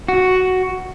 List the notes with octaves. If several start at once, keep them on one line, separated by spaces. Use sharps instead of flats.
F#4